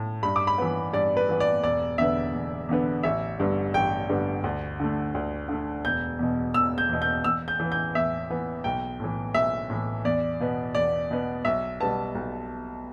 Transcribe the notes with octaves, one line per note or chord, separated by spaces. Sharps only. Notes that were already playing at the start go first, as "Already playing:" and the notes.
Already playing: A2
G2 B5
D6
B5
E3 B3
G2 D5
B4
E3 B3
D5
E1 D5
E2 D3 B3 E5
E1
E2 D3 B3
A1 E5
G2 D3 G3 B3
A1 G5
G2 D3 G3 B3
D2
D3 A3
D2
D3 A3
E1 G6
E2 B2
E1 E6
G6
E2 B2
G6
E2 E6
G6
E3 B3
G6
E2 E5
E3 B3
B1 G5
A2 E3
B1 E5
A2 E3
E2 D5
B2 B3
E2 D5
B2 B3
B1 E5
B2 G3 B3 A5
B1